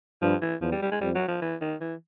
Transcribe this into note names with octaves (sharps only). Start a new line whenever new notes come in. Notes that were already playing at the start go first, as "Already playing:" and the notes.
G2 F3
E3
E2 F3
G3
G3
G#3
F2 G3
F#3
F3
E3
D#3
E3